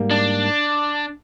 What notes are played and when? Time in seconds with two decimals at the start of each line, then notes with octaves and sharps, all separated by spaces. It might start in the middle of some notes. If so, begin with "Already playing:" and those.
Already playing: G#2 G3 A#3
0.11 D4